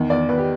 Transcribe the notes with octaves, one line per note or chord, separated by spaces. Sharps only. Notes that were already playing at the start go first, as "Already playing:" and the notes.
Already playing: E2 D#3
E2 D5
E2 B4
G4